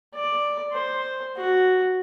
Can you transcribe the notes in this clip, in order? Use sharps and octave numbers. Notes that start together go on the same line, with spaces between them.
D5
C5
F#4